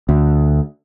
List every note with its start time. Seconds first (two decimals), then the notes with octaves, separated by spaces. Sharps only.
0.09 D2